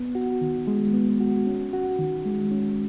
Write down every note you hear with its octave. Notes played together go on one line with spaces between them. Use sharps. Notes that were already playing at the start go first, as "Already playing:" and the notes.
Already playing: B3
F#4
D#3
G#3
B3
F#4
C#4
F#4
D#3
G#3
C#4